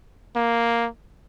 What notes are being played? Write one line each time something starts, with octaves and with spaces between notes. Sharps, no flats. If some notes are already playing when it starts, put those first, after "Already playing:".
A#3